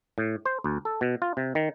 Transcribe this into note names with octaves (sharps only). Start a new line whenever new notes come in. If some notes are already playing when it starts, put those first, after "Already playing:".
A2
C5
D2
A4
B2
F4
C3
D#3